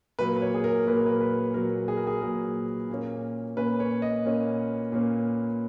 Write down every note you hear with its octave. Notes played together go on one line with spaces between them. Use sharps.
A#2 F#3 A#3 B4
C#5
G#4
A#4
A#2 F#3 A#3 B4
A#4
B4
B4
A#2 F#3 A#3 A#4
G#4
A#4
G#4
A#2 F#3 A#3 A#4
A#2 A#3 C#4
A#2 A#3 C#4 B4
C#5
D#5
A#2 A#3 C#4
A#2 A#3 C#4